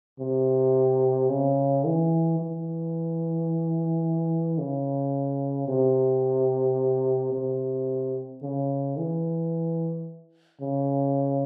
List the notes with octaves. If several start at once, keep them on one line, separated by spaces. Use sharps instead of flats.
C3
C#3
E3
E3
C#3
C3
C3
C#3
E3
C#3